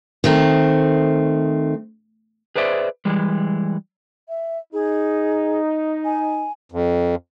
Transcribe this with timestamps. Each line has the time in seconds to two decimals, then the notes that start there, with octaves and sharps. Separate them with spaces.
0.24 D#3 A3 C4
2.56 G#4 B4 C5 D5 E5
3.05 E3 G3 G#3
4.29 E5
4.73 D#4 G#4
6.05 G#5
6.72 F2